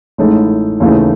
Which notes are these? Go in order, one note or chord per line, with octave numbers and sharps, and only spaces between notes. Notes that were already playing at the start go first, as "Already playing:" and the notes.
A1 A2 G#3 D#4 A4
D#2 C#3 E3 A3 D#4